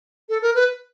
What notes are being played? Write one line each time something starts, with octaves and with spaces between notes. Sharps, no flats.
A4
A#4
B4